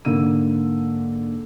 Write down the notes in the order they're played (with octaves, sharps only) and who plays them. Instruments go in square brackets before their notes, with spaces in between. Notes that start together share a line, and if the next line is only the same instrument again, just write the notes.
[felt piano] G#2 D3 A#3 E6 D#7